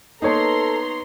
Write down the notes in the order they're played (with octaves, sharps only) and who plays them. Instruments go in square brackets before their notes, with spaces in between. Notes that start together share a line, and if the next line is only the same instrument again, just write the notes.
[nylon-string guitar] A#3 B3 [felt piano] D#4 C#5 [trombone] A4 [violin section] A#5 C6